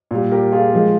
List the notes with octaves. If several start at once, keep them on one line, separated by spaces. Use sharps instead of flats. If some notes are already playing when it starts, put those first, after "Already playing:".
A#2 G3
G4 A#4
F4 G#4
F3 G#3